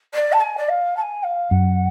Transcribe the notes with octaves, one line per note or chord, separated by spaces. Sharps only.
D5
A5
G#5
D5
F5
A5
G#5
F5
F#2 F#5